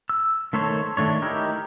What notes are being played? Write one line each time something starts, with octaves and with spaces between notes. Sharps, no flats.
E6
D#3 A3 A4 C5 C#5
D#3 A3 D4 C#5
D#4 E4 G4 A#4